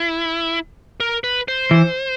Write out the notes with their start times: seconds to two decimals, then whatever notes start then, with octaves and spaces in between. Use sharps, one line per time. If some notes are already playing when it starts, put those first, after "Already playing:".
Already playing: E4
1.00 A#4
1.24 B4
1.48 C5
1.71 E3